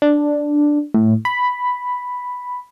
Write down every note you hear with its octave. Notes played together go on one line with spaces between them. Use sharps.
D4
A2
B5